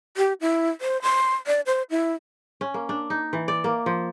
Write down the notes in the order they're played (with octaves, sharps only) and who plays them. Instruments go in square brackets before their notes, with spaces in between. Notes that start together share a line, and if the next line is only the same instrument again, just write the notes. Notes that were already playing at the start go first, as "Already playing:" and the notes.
[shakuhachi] G4
E4
C5
C6
D5
C5
E4
[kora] C#4
A#3
D4
D#4
E3
D5
A#3
F3